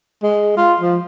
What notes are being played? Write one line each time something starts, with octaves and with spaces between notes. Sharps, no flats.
G#3
F4
F3